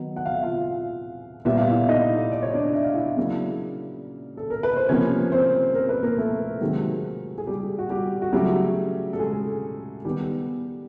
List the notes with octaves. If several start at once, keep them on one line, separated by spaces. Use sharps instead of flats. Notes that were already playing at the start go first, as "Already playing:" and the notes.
Already playing: D#3 F#3 B3 D#4
F#5
F5
E5
F4 F5
A#2 G3 B3 E5
F5
E4 E5
D#4 D#5
D5
C#5
D4 D5
E5
F5
E4 E5
C#3 F#3 A#3
A4
A#4
B4
C5
C3 F3 A#3 C#4 C#5
C4 C5
A#4
B4
A#3 A#4
A3 A4
C3 D#3 F#3 G#3 A#3 G#4
G#4
G3 G4
F#4
G3 G4
F#4
C#3 F#3 G3 A3 G4
A4
G#3 G#4
D#3 G3 B3 G4